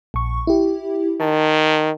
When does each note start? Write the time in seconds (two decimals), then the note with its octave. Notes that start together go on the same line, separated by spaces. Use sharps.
0.14 A#1 C#6
0.47 E4 G4
1.21 D#3 A5